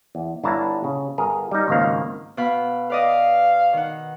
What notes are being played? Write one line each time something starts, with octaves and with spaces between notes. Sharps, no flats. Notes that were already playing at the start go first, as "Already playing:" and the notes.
E2
G1 D4 E4 C#5 A5 A#5
C#3
G1 G#4 A#4
G3 D#4
G#1 C#2 D#3 A#3 F5
B2 F5 B5
B4 D5 D#5 F5
D#3 F#5